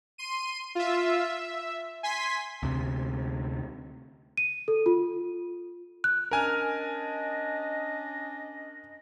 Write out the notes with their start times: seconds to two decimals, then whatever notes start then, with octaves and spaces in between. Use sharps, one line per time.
0.18 C6 D#7
0.75 F4 E5
1.23 E5
2.03 G#5 C6 B6
2.63 D2 C3
4.37 D#7
4.68 A4
4.86 F4
6.04 F#6
6.31 C#4 D4 A#4 D#5 G#5 F6